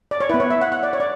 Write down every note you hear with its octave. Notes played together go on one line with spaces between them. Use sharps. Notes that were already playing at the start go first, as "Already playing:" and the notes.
D5
C#5
B3 E4 B4
C#5
E5
F#5
F#5
D5
C#5
D5